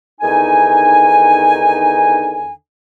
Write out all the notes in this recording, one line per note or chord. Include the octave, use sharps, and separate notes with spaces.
E2 D3 D#3 D#4 G#5